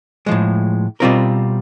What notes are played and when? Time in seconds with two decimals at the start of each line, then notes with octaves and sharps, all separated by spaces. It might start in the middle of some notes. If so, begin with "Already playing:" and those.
0.26 A2 F3 G#3
1.00 B2 G3 C4 F4 A#4